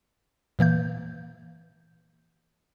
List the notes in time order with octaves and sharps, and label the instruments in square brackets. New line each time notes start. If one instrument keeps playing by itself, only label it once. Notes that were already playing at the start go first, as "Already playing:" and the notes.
[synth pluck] A#2 E3 A#3 G6